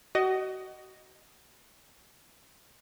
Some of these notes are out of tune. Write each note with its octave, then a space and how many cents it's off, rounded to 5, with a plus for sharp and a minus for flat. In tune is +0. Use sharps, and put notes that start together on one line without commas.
F#4 +35 D#5 +0